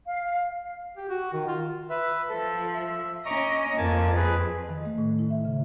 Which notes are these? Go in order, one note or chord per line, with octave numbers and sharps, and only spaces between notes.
F5
G4
F#4
D#3
F4
B4 E5
F3 A4
E5
C#4 D#5 A#5 C#6 D6
F2 A#3 G#5 A5
G#4 B4
D#3
A3
A2
E4
E5
C#3